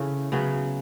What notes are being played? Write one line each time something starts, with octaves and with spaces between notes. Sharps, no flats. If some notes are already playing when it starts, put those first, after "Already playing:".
Already playing: C#3 E3 A3
C#3 F#3 B3